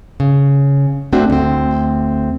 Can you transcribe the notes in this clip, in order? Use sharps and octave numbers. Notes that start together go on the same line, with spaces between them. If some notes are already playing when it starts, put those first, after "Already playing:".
C#3
A3 C4 D4 F#4
D2 C4